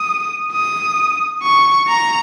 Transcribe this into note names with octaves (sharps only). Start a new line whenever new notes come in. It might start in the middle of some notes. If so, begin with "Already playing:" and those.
Already playing: D#6
D#6
C#6
A#5